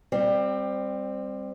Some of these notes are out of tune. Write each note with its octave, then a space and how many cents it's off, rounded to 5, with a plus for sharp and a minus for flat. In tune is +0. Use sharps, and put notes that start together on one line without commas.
G3 +20 C4 +0